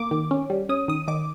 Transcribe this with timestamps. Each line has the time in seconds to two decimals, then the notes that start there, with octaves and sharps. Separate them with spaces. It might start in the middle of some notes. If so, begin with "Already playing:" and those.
Already playing: A#3 D6
0.11 D#3
0.31 C#4
0.50 G3
0.69 C#4 D#6
0.88 D#3 D#6
1.08 D#3 D6